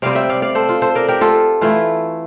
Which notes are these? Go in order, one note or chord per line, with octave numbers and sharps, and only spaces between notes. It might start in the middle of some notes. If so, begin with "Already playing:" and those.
C3 G3 C4 D5 F5
E5 G5
D5 F5
D5 F5
A4 C5
F4
A4 C5
A#4 D5
G4 A#4
F4 A4
E3 A3 E4 F4